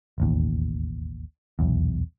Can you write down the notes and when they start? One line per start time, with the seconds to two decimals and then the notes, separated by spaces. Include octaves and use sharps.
0.18 E1 A1 D#2
1.59 D#1 B1 E2